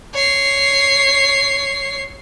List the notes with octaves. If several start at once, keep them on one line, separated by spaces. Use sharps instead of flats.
C#5 C7